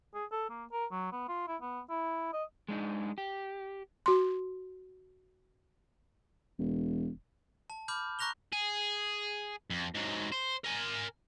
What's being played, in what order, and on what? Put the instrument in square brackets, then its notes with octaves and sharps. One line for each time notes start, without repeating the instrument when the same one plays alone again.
[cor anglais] G#4
A4
A#3
A#4
F#3
B3
F4
E4
B3
E4
D#5
[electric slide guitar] G#3 D4 D#4
G4
[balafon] F#4 C6
[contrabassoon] E1
[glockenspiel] A5
B5 D6 F6 G6
A#5 C#6 F#6 A#6 F7 G7
[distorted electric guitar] G#4
F2
G#2 F#3
C5
A#4 G#5